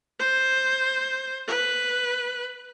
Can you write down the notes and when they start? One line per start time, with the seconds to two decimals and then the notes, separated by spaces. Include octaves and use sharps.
0.20 C5
1.47 B4